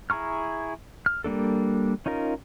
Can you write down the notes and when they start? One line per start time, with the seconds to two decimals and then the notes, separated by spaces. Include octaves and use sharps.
0.10 E4 G#4 A#5 C#6 F6
1.06 F6
1.24 G3 A#3 D4 A4
2.06 C#4 D#4 F4 A#4